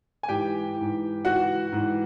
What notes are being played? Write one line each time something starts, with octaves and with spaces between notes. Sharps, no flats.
G#5
G#2 E3 G4 G5
G#2 E3
G#2 E3 F#4 F#5
G#2 E3